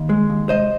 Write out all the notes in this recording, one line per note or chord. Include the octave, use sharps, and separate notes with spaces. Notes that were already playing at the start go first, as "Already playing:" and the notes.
Already playing: D#2
G#3
D#2
C3 C5 D#5